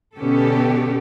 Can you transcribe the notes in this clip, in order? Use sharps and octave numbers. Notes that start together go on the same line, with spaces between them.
B2 D3 B3 C#4 G4 A4